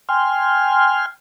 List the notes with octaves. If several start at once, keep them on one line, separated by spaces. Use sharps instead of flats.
G5 G#5 C6 F6